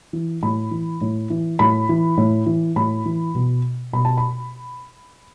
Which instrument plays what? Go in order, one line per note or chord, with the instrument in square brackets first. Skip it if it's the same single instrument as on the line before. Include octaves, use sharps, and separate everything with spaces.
[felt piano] E3
A2 B5
E3
A2
E3
A2 B5
E3
A2
E3
A2 B5
E3
B2
B2 B5
A5
B5